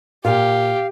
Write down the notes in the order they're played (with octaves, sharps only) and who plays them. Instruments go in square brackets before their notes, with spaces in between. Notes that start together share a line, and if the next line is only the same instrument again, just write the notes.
[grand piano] A#2 [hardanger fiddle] G4 [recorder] F5